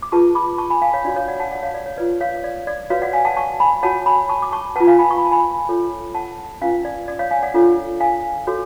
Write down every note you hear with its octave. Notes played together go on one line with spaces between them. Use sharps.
D6
F4 G#4 B4 A5 C#6
B5 D6
A5 C#6
G#5 B5
F5 G#5
C#5 F5
D4 F#4 C#5 D5
C#5 F5
D5 F#5
F#5 A5
D5 F#5
C#5 F5
D5
C#5
F4 B4 D5
C#5 F5
D5
D5
F#4 B4 C#5 F5
D5 F#5
F5 G#5
F#5 A5
A5 C#6
G#5 B5
F#4 C#5 F#5 A5
G#5 B5
A5 C#6
D6
A5 C#6
F4 B4 F#5 A5
F5 G#5
G#5 B5
C#6
B5
A5
G#5 B5
F4 A4 C#5
F#5 A5
C#4 F4 B4 F5 G#5
D5
D5
C#5 F5
F5 G#5
D5 F#5
D4 F4 A4 C#5
F5 G#5
F#4 A4 C#5